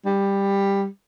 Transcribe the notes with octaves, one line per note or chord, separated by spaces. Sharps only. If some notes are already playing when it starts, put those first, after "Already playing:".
G3